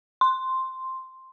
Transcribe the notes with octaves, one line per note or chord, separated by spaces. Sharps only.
C6